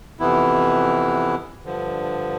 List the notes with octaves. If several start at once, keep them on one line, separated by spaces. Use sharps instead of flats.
F2 C3 E3 B3 E4
G2 D3 F3